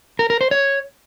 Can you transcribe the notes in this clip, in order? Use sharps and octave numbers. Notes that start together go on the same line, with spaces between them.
A#4
A#4
C5
C#5